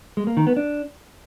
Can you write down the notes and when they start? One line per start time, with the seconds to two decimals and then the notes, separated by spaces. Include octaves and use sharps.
0.17 G#3
0.27 A#3
0.37 D#3
0.47 B3
0.57 D4